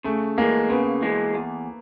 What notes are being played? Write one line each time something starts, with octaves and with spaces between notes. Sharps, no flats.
C#3 A3
E3 G#3 A#3
C#3 B3
E3 G#3
E2